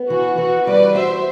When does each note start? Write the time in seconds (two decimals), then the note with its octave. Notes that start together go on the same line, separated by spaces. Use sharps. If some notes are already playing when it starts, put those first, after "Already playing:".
Already playing: B3
0.10 E3 F#4
0.38 E3 F#4
0.67 G3 B4 D5
0.95 F#4 C5 E5